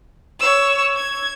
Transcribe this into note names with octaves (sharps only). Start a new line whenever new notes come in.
C#5 E6
G#6